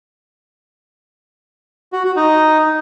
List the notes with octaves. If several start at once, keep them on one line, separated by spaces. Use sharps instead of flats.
F#4
F#4
D#4